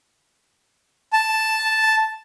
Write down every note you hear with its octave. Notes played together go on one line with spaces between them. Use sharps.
A5